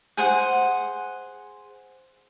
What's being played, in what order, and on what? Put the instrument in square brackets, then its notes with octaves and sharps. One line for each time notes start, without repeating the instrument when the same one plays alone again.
[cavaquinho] G#4 C5 F#5